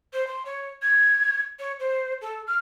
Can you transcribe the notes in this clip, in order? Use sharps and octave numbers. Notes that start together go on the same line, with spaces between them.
C5
C6
C#5
G#6
C#5
C5
A4
F6